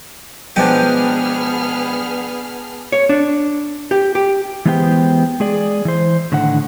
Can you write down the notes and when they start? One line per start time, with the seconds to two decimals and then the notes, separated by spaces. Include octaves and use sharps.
0.56 B2 F3 G#3 B3 D4 G#4 G5 F6
2.92 C#5
3.09 D4
3.91 G4
4.15 G4
4.65 E3 G#3 B3 G4 C5 G5
5.40 G#3 G#4 D5
5.85 E3 C5
6.32 A2 D3 D#3 F#5